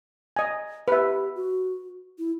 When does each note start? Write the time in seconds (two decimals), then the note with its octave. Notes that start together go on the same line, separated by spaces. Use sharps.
0.36 D#5 G#5
0.88 G4 B4 E5
1.35 F#4
2.18 E4